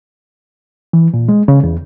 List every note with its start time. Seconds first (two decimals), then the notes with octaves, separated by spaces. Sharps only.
0.93 E3
1.14 A#2
1.29 G#3
1.48 C#3
1.64 E2